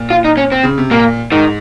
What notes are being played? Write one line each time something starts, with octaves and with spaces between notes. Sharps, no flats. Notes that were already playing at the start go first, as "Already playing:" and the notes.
Already playing: A#2
F4
D#4
C#4
C4
C#3
C3
A#2 A#3
G#2 D#3